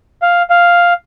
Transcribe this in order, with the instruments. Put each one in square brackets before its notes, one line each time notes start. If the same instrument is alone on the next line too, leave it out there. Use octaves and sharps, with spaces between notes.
[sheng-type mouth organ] F5
F5